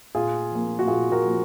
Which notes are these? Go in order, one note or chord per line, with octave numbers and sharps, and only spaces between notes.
A#2 F4 G#4
F3 A#3
F#4
A#2 F4 G#4
F#4 A#4
F3 A#3